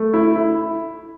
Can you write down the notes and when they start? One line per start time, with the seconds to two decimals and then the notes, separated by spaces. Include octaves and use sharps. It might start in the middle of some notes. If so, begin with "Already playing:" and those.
Already playing: A3
0.14 E4
0.36 E4